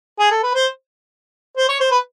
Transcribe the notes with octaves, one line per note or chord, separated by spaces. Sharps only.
G#4
A4
B4
C5
C5
C#5
C5
B4